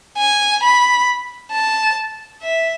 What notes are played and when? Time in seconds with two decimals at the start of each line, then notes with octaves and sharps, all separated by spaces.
0.18 G#5
0.63 B5
1.52 A5
2.43 E5